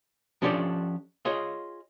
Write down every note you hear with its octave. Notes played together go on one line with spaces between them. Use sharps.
F3 C#4 D4 G4 A4 D5
F4 G#4 C#5 D#5